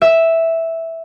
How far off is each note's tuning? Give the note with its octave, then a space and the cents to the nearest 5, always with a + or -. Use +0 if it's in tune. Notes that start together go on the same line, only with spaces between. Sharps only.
E5 -5